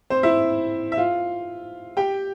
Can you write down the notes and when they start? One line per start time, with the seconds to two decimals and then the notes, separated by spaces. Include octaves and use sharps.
0.10 C4 C5
0.23 E4 E5
0.92 E5
0.97 F4 F5
1.97 G4 G5